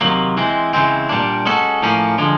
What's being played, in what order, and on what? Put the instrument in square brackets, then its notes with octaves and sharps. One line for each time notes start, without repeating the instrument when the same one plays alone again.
[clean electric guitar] C3 D#3 F#3 A#3
E3 G#3 C4
C#3 E3 G#3 C4
A#2 G3 A#3 D4
G#3 C#4 F#4 A4
A2 F3 A#3 C#4
D3 F3 G#3